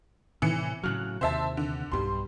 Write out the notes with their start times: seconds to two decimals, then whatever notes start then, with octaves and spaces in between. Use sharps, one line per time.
0.42 A2 C3 E3 C#7
0.83 A2 C#3 F#3 F6 F#6
1.21 D#2 C3 C5 E5 A5
1.57 D3
1.92 B1 G2 G3 C6